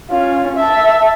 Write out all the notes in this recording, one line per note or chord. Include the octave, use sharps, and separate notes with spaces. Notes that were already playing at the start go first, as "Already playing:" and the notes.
C#4 F4
E5 A5